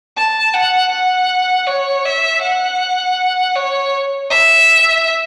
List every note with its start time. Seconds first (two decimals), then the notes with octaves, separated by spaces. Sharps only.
0.17 A5
0.54 F#5
0.92 F#5
1.67 C#5
2.05 E5
2.42 F#5
3.56 C#5
4.30 E5